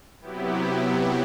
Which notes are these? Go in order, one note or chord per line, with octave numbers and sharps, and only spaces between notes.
C3 F#3 B3 E4 G4